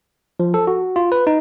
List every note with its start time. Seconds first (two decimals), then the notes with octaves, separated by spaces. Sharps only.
0.40 F3
0.54 A4
0.67 F#4
0.96 F4
1.12 B4
1.27 D#4